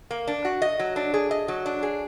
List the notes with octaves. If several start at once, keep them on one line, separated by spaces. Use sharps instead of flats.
A#3
D4
F#4
D#5
F#3
D4
G#4
D#5
F#3
D4
G#4